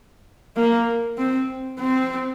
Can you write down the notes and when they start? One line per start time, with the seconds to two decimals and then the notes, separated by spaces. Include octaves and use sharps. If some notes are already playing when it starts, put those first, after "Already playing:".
0.57 A#3
1.18 C4
1.80 C4